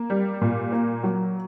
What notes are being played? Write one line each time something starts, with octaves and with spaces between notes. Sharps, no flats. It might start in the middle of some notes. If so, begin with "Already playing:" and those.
Already playing: A#3
G3
A#2
A#3
F#3